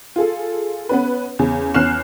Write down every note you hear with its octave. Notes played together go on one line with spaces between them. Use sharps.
F4 G#4 A4
B3 C#4 B4
E2 C#3
E2 C#4 F6 F#6 C7 E7